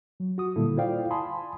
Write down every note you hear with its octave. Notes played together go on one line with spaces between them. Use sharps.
F#3
F#4 D#6
A#2 D3 G3 A#3 E4 A4
E4 F4 C5 D5 F5 G5
G#5 A5 B5 C6 D#6